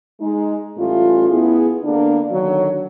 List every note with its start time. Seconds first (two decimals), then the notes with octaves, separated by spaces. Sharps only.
0.21 G#3 D#4
0.78 A2 E3 G3 C#4 F4
1.29 B3 E4 G#4
1.84 D3 A#3 B3 D4
2.30 D3 D#3 F#3